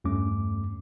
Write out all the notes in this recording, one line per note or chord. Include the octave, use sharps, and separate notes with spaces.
E2 G2 A3 C#4 D6